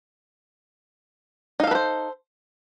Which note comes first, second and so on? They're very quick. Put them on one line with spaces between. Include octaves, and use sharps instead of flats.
D#4 F5 A4 B4 C5